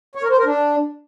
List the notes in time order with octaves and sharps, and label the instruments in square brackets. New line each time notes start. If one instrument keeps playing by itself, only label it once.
[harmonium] C#5
A#4
C5
A#4
D4